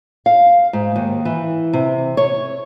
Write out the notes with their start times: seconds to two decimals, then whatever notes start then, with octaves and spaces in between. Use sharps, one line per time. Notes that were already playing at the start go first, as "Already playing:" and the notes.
0.26 F5
0.73 G#2
0.96 D#2
1.25 E3
1.73 C3
2.17 C#5